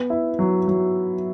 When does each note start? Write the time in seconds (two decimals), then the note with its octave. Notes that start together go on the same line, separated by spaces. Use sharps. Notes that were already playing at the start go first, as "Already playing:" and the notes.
Already playing: B3
0.10 E4
0.39 F#3
0.68 F#3